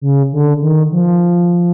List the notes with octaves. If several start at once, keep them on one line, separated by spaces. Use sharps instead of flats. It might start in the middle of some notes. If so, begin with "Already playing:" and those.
C#3
D3
D#3
F3